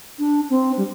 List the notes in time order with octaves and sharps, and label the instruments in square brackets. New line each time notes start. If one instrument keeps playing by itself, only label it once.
[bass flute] D4
C4
G3